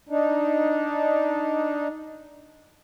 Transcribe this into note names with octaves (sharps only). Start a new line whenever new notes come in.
D4 D#4